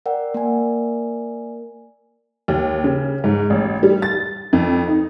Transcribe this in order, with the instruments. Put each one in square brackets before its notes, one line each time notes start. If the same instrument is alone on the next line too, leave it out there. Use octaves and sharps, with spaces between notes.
[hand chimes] A#4 D5 F#5 G5
A#3 A#4 D5 G#5
[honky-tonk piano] D#2
C#3
G#2
A1
G3
A6
F2
D#4